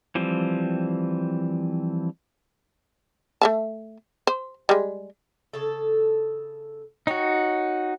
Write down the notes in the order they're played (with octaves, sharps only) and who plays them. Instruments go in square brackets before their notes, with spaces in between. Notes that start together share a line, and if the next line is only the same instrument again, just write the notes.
[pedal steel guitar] E3 F3 G3 C4
[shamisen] A3 E5 A5
C5
G3 G#3
[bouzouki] C#3 A4
[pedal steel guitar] D#4 F#4 [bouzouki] C#5 G5